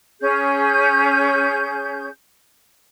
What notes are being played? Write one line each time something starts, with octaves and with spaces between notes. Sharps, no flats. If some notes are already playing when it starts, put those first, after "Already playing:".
C#4 G#4 G6